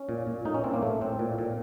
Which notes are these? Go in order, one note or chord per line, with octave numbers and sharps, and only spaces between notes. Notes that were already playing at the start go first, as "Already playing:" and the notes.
Already playing: C#4
A#2
A#2
A2 D#4
C#4
A2 C4
A#3
A2 A3
A2 C4
A#2
A#2